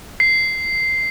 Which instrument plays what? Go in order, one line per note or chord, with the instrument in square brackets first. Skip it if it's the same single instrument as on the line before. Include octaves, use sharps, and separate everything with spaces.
[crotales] C7